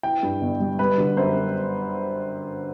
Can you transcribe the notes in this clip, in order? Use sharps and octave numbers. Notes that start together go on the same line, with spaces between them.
E3 G5
G2
G1
G3
G3 B4
D3
F#2 C5
F#2